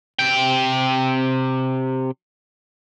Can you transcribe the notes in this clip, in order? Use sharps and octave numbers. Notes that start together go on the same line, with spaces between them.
C3 G5